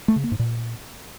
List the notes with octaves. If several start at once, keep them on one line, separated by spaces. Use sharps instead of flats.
A3
C#3
A#3
G#2
A#2